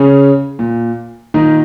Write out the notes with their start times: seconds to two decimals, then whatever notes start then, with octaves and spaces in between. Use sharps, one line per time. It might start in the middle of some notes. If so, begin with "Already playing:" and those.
Already playing: C#3 C#4
0.59 A#2
1.34 A#2 D#3 D#4